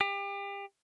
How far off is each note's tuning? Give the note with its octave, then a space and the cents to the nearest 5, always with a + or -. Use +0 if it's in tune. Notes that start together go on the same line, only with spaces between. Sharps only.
G4 +30